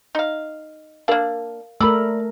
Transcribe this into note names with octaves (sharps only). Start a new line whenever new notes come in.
D#4 F5
A#3 D4 A#4 F5
A3 A#4 D5 B5 E6